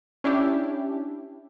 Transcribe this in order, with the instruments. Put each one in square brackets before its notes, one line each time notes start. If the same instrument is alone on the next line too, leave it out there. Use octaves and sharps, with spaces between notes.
[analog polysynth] C#4 D4 E4 G4